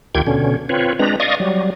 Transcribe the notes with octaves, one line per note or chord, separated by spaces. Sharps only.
D2 D#3 F4 G4 G5 G#6
B2 D3 C#4
C4 F4 B4 C#5
G#3 C4 D4 B4 A#5
D5 D#5 F5 C#6 D#6
F#3 G3